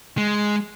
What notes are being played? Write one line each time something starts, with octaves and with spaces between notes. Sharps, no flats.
G#3